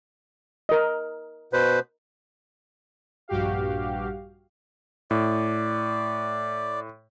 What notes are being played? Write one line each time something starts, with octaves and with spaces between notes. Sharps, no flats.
A#4 D#5
B2 B4 C5
A#1 G2 F#4 G4 F5
A2 D5